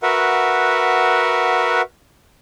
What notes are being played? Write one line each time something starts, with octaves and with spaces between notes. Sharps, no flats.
F#4 A#4 B4 E5 F#5